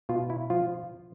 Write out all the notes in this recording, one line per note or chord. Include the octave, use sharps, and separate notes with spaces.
B2 F4
E4
F3 F4